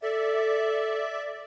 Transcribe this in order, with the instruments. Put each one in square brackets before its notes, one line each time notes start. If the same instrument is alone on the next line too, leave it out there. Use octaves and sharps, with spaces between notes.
[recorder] A4 [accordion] D5 E5